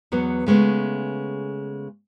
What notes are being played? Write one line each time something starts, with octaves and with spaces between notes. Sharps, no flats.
E2 F#3 B3
C#3 G#3 A3 B3